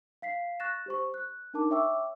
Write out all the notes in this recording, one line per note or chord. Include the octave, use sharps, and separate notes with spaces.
F5 B6 C7
C#6 F#6 A6 A#6 E7
G4 C5 C#6
F#6
D4 D#4 A#4 A5 D6
C#5 E5 G5 C#6 D6 E6